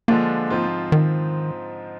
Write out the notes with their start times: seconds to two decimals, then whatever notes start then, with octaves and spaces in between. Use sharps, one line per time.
0.08 D3 F3 G#3 A#3 D4 F4
0.50 G#2 F3 C4 F4
0.92 D#3